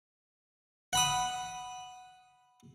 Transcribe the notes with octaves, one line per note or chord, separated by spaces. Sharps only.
F#5 B5 D#6